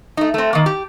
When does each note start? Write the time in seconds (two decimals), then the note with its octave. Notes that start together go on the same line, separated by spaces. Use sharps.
0.17 A3 D#4
0.34 A3 C4
0.53 D#3 A#3
0.66 G4